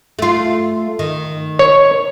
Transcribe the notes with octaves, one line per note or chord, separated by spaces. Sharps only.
A3 F4
D#3
C#5